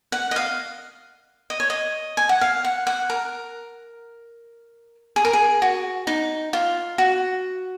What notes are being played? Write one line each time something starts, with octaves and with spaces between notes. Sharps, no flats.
F#5
D#5
F5
D#5
C#5
D#5
G#5
F#5
F5
F#5
F#5
A#4
G#4
A#4
G#4
F#4
D#4
F4
F#4